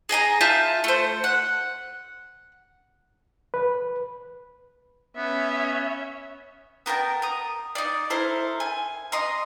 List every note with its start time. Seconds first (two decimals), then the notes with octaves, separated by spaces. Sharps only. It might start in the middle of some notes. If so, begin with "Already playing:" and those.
0.09 G#4 D#5 G#5 A#5
0.41 F4 E5 A5 G6
0.84 A3 C5
1.24 F#5
3.54 B4
5.17 B3 C#4 E5
6.86 B3 A#4 G5 A5
7.22 A#5 D#6
7.75 D#4 D5
8.10 E4 A4 A#4 C5
8.60 G#5
9.12 D#5 A#5 C6 D#6